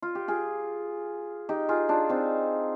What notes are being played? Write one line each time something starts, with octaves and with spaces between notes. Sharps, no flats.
F4
G4
F4 G#4
D#4 G4
F4 G#4
D4 F4
C4 D#4